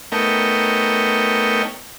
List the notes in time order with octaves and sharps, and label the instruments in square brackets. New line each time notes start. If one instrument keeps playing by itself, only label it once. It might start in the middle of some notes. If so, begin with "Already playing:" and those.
[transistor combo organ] A3 B3 D#4 A#4 C#5 G5